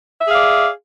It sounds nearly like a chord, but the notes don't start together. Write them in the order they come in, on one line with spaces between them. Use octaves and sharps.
E5 G#4 F5 D5